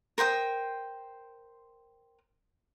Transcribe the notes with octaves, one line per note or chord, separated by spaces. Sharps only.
A#4 C5 G5 D#6